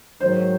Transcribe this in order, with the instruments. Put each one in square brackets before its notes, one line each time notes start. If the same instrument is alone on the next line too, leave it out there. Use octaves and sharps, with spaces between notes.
[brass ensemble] G#2 D#3 F#3 [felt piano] C5